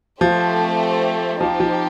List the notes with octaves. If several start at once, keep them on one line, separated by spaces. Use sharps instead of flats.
F3 A3 C4 G4 C5
F3 C4 D#4 G4
F3